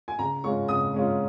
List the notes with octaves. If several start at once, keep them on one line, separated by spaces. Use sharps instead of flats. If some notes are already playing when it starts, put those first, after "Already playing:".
G#5
C#3 A#5
G#3 C#4 F4 C#6
C#3 D#6
G#3 C#4 F4